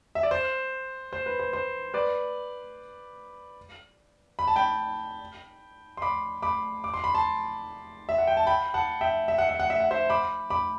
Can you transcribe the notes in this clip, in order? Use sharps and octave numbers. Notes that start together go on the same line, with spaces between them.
E5
D5
C5
C5
B4
C5
C5
B4 D5
B5
A5
G5 B5
C6
B5 D6
B5 D6
D6
C6
B5
A5 C6
E5
F#5
G5
A5
G5 B5
F#5 A5
E5 G5
E5
F#5
E5
F#5
E5
F#5
C5 E5
B5 D6
B5 D6